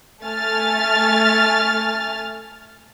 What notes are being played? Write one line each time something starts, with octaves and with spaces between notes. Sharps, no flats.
A3 G#5 F6 A6